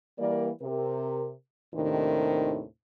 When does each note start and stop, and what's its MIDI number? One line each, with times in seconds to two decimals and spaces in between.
0.19 0.50 52
0.19 0.50 55
0.19 0.50 58
0.19 0.50 70
0.19 0.50 74
0.61 1.32 48
0.61 1.32 70
1.74 2.64 39
1.74 2.64 45
1.74 2.64 48
1.74 2.64 51
1.74 2.64 62
1.74 2.64 72